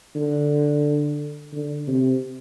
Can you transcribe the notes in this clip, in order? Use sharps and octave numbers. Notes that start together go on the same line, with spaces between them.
D3
D3
C3